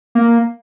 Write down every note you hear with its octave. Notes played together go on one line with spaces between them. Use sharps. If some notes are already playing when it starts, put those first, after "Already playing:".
A#3